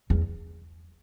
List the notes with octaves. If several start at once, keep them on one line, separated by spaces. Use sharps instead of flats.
E2